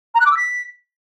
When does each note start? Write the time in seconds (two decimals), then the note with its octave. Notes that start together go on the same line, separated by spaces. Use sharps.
0.14 A#5
0.20 F#6
0.25 D6
0.31 E6
0.37 B6